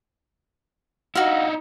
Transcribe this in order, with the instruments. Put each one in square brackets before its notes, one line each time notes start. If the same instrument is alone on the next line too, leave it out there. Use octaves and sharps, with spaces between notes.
[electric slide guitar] D#4 E4 [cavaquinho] F#4 F5